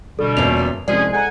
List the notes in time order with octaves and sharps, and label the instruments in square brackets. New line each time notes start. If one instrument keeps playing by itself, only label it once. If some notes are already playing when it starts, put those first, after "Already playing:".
[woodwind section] B2 G3 [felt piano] D3 [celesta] A4
[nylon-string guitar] E2 A#2 [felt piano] B3 C#4 [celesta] F7
[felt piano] C2 F2 [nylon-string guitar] G#3 [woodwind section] C#4 G#4 [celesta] D5
[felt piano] G#4 A4 A#5 [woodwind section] F#5 G#5